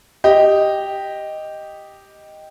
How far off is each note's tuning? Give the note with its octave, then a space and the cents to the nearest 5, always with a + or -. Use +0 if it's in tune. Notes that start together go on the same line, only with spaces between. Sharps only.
G4 +0 D#5 +0